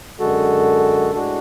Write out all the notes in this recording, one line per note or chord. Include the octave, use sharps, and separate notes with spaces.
F#2 D3 G#3 F#4 A4
A2 G#3 D4 F#4